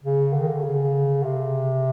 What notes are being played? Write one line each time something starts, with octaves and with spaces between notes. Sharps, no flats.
C#3
D3
D#3
D3
C#3
C3